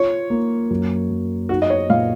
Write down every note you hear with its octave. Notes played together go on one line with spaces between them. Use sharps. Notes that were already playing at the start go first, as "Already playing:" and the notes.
Already playing: F4 C#5
A#3
F#2
F#2
D#4 F#4
D#5
C#5
A#2 F5